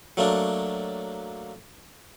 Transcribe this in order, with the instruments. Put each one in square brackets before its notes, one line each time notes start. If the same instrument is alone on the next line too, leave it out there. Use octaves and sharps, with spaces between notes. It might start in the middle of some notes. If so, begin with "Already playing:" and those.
[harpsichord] F#3 A3 A#3 D4